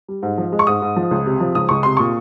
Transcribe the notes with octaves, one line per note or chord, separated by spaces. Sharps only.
G3
G#2
F3
G#3
C#6
G#2 D#6
G#2
F3
C#2
C3
F3
C#2 D#6
C#2 C#6
C3 C6
A#2 C#6